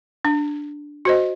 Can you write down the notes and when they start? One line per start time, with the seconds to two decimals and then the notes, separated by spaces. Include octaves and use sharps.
0.25 D4
1.05 F#4 C5 D#5